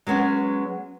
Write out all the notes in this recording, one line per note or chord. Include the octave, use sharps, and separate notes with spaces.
F#3 G#3 B3 C#4